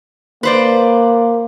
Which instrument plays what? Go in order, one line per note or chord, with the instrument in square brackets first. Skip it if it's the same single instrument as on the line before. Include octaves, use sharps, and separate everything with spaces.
[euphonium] A#3 [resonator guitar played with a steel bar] B4 C5 D5